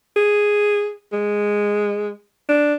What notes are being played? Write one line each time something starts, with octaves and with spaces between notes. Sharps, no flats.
G#4
G#3
D4